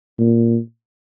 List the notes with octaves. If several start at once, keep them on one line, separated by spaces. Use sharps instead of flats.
A#2